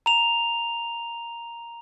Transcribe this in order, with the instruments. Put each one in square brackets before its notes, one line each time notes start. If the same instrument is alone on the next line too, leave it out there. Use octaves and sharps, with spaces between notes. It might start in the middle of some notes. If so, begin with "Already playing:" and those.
[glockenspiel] A#5 F7